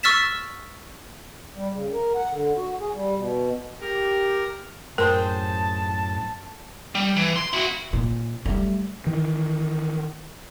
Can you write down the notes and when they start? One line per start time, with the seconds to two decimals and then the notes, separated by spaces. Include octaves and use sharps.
0.03 C#6 E6 F6 A6 B6 E7
1.56 G3
1.73 C#3
1.92 A#4
2.15 F#5
2.31 D3
2.56 F#4
2.80 G#4
2.93 G3
3.15 B2
3.81 G4 A#4
4.98 F#2 A2 G#4 A#4 C5 G5 A5
6.95 G3
7.16 E3
7.36 C6
7.53 E4 F#4
7.93 A#2
8.45 G3 A3
9.07 D#3 E3